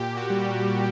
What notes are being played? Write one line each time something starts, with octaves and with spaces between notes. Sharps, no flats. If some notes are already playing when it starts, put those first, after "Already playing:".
Already playing: A#2 G4
F#4
G3